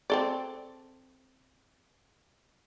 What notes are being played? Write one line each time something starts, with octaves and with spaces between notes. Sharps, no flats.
C4 A4 D5